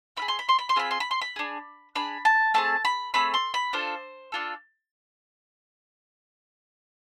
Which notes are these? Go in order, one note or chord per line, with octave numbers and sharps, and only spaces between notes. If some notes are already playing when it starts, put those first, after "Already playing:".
C4 F4 B5
G#4
C6
B5
C6
B5
C6
C4 F4 G#4 B5
C6
B5
C6
B5
D4 G#4
D4 G#4 B5
A5
A3 C4 G#4 A5
B5
A3 C4 G#4 B5
C6
B5
D4 F4 A4 C5
D4 F4 A4